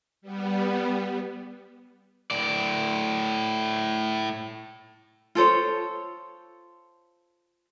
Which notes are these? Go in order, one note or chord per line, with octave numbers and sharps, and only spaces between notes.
G3 B3
A2 D5
F4 A4 C5 C#5